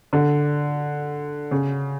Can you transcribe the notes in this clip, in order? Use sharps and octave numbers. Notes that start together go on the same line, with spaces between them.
D3
C#3